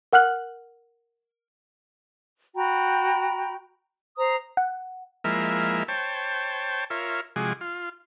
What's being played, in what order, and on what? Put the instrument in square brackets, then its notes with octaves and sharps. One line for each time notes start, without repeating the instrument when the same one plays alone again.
[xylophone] A#4 F#5 F6 F#6 F#7
[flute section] F#4 G5 A#5 B5
C5 A#5 D#6
[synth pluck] F#5
[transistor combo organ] F3 G#3 A#3 E4 A#4 E5
C5 C#5 G5 A5
F4 A#4 C#5 E5
C3 F3 G#3 F#4 G#4 D6
F4